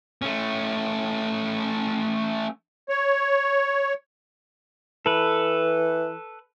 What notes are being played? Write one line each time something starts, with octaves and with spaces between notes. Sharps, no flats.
A3 C#4
C#5
E3 A4 B4